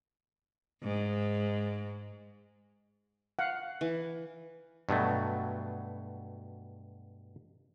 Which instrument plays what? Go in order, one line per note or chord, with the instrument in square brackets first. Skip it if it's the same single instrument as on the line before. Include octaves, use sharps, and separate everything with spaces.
[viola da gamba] G#2
[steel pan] F5 F#5
[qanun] E3
[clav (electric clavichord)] G2 B2 F#3 A3